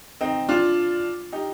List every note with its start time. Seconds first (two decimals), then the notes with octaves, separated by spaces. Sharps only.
0.21 C4 D#4
0.49 D4 F4
1.32 D#4 G4